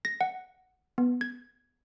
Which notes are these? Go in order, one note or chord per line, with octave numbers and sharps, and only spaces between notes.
A#6
F#5
B3
G#6